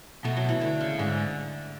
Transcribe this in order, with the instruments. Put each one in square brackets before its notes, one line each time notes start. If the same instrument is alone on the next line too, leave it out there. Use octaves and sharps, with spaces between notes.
[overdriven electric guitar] B2 [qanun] A3
[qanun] F#3
E3
D3
C#3
[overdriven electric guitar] G#2 [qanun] D3